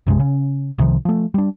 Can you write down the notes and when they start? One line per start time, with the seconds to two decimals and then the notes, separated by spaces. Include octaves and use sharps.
0.07 B1 F#2 C3 G#3
0.19 C#3 C#4
0.78 C2 C3 D#3 F3
1.05 F3 A3
1.34 G3 D4